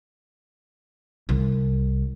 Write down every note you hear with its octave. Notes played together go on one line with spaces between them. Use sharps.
C2